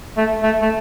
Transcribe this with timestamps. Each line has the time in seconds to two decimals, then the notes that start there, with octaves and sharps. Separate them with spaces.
0.17 A3
0.43 A3
0.61 A3